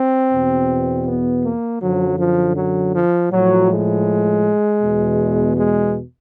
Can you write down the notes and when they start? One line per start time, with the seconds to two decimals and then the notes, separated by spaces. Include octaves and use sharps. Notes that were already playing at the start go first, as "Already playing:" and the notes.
Already playing: C4
0.32 E2 B2
1.06 B3
1.44 A#3
1.81 F#2 D3 F3 F#3
2.18 F3
2.57 F#3
2.94 F3
3.31 A2 F3 F#3
3.69 G#3
4.82 E2 B2
5.56 G#3